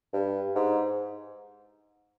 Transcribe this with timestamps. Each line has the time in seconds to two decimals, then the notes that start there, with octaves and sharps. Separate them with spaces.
0.13 G2
0.55 G#2